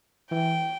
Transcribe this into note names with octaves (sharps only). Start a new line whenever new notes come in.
E3 G5